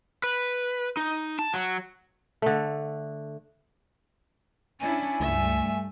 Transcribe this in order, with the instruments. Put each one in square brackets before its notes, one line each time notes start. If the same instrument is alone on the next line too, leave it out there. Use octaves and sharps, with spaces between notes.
[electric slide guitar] B4
D#4
A5
F#3
[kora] D3 A3
[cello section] C#4 D4 E4 [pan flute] G#5
[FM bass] C#2 [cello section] G2 A3 [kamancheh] E5